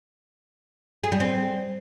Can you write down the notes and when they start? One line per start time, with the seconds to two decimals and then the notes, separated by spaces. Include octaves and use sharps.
1.04 G#4
1.12 G3
1.20 C4